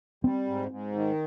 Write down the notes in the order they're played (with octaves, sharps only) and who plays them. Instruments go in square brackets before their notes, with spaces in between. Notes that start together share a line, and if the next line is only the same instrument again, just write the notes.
[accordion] G3 [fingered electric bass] C4
[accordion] G#2
G#2
D#3